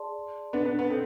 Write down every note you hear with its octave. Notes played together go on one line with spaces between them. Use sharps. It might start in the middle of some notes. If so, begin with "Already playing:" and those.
Already playing: G#4 D5 A5 C6
B3 D4
B3 D4
B3
C4 A4